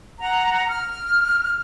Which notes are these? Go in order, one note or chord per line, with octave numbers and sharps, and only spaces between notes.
F#5 A#5
F6